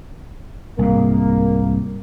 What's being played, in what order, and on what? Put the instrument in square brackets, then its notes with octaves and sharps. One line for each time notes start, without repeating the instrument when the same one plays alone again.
[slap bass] C2 G#2 [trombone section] A#3